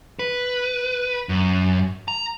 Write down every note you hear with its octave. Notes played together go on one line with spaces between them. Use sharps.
B4
F#2
A#5